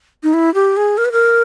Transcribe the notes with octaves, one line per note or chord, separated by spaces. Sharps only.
D#4
E4
G4
G#4
A#4
B4
A#4